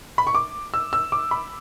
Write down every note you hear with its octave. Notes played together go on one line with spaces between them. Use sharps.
B5
C#6
D6
E6
E6
D6
B5